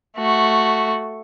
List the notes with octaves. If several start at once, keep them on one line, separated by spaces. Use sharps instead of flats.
A3 F#4